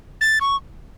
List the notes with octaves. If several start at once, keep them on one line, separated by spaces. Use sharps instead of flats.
A6
C#6